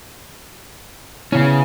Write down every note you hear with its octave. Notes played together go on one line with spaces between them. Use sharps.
C#3 B3 C#4 E4